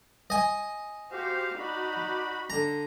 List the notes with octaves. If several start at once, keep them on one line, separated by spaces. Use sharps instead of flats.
D#5 G#5
F#4 G4 C5 F5
D#4 F#4 D5 B5
D3 A#5